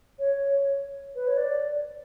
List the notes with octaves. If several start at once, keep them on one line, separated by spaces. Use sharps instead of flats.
C#5
B4
C#5
D5